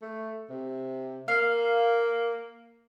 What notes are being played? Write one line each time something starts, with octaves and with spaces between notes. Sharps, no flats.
A3
C3
A#3 F5